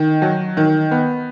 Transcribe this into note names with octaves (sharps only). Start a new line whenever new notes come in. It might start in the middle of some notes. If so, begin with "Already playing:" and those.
Already playing: D#3
F#3
D#3
B3